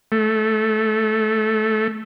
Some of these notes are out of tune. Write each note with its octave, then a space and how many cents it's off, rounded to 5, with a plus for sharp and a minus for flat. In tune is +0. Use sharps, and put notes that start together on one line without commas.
A3 -15